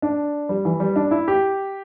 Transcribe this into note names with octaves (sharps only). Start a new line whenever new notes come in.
D4
G3
E3
G3
D4
E4
G4